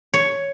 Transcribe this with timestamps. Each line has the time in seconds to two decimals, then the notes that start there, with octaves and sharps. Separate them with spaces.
0.14 C#5